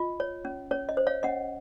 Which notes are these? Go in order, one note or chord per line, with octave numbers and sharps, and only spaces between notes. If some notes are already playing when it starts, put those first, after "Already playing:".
Already playing: F4 D#5
C#5
C#4
C#4 C#5
D#5
C5
C#5 F5
C#4 D#5 F#5